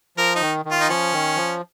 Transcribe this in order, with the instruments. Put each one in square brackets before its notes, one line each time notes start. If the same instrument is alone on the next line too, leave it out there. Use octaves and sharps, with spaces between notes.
[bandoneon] F3 [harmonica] A#4
[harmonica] D#4
[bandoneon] D#3
D#3
[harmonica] F4
D#4
[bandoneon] F3 [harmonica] C#4
[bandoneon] D#3
F3